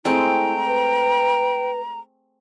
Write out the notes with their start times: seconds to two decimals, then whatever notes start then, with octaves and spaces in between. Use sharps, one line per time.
0.05 G#3 A3 C4 E4 G5 A#5
0.67 B4